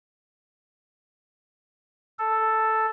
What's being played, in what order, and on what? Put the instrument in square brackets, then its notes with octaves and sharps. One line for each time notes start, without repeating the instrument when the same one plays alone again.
[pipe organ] A4